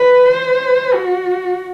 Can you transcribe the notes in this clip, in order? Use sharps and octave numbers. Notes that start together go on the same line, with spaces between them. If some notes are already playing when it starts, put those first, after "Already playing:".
Already playing: B4
C5
F#4